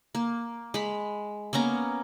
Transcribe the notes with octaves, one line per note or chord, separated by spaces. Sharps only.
A#3
G#3 B5
A#3 B3 C#4 A#5